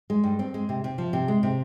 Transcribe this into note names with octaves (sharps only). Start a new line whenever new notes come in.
G#3
G2
C4
G#3
C3
C3
F3
C3
G#3
C3